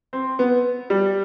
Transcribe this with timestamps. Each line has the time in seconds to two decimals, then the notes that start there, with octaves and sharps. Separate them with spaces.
0.13 C4
0.39 B3
0.90 G3